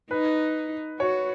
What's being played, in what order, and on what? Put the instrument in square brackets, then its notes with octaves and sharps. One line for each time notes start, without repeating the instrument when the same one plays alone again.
[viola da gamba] D#4 [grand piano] B4
[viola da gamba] F#4 [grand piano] C#5